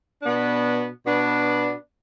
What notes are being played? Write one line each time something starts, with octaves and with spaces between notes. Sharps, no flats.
B2 B3 D4
B2 B3 D4